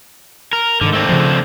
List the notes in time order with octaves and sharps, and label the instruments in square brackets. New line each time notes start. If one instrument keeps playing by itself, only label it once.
[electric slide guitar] A#4
[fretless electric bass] G#2 D#3 [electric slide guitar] D3
[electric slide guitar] A3 C4 D4
[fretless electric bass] C#3 F3